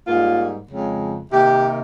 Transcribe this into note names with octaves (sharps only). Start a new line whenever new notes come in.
G#2 G3 A#3 F4
F2 C#3 G#3
C3 D#3 A#3 G4